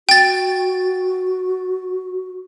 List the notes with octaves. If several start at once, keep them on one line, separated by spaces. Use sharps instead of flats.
F#4 G5 A6